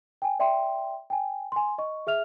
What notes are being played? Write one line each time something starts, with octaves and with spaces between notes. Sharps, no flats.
G5 G#5
D5 E5 G5 C6
G5 G#5
G#5 C6
D#5 C#6
G#4 E5 F6 F7